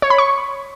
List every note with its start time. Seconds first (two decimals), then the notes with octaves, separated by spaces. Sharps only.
0.02 C#5
0.10 B5
0.18 C#6